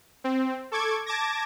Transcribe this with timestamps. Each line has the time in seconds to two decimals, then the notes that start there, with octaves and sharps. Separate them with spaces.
0.24 C4
0.72 A4 C#6 D6 G#6
1.06 A5 D6 G#6 A#6